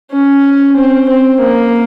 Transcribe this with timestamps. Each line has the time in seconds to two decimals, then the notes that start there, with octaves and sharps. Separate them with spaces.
0.12 C#4
0.77 C4
1.09 C4
1.41 A#3